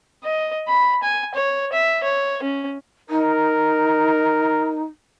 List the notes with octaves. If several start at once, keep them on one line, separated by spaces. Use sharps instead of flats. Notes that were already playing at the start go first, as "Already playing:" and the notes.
D#5
B5
G#5
C#5
E5
C#5
C#4
D#4 A#4